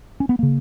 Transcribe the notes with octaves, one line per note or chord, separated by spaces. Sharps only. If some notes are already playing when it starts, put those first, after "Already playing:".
C#4
B3
C#3 A#3